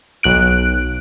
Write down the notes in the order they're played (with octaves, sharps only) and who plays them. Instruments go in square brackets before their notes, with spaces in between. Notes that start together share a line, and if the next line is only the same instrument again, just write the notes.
[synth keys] B1 F#6 D7